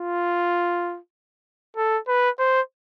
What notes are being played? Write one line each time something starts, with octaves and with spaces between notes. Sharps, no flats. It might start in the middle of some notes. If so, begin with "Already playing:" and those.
Already playing: F4
A4
B4
C5